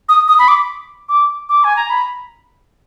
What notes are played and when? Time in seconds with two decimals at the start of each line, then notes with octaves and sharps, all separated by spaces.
0.09 D#6
0.28 D#6
0.39 B5
0.48 D6
1.09 D6
1.49 D6
1.64 G#5
1.76 A#5
1.90 B5